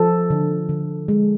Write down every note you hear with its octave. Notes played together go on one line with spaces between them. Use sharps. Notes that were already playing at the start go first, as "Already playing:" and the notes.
Already playing: F3 A4
D3
D3
G#3